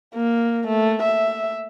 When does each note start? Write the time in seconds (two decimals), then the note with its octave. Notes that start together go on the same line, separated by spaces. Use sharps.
0.15 A#3
0.67 A3
1.02 E5